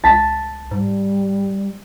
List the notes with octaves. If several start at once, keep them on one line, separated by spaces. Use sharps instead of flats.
C#2 A5 B6
G#2 G3